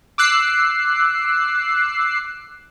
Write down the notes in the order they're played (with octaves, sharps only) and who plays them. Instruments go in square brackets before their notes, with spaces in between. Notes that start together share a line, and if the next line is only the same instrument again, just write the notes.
[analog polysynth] D6 E6 F#6 C7